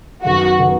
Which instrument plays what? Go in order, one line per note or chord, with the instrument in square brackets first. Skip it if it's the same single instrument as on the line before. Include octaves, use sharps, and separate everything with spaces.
[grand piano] F#2 D#3 B3 G#4 [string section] F#4
[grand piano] D#3 B3 G#4